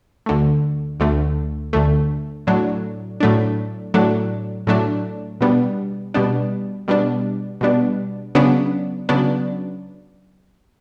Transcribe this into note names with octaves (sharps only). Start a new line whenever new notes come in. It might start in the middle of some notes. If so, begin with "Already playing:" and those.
D2 D3 A3
D2 D3 A3
D2 D3 A3
A2 F#3 A3 D4
A2 F#3 A3 D4
A2 F#3 A3 D4
A2 F#3 A3 D4
B2 G3 B3 D4
B2 G3 B3 D4
B2 G3 B3 D4
B2 G3 B3 D4
C#3 F#3 B3 D4
C#3 F#3 B3 D4